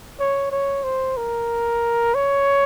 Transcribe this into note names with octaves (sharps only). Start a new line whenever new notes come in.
C#5
C#5
C5
A#4
C#5